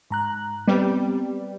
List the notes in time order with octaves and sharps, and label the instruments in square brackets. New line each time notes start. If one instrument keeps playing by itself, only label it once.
[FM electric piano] G#2 A#5 F#6
[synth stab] G3 [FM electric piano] B3 C4 D5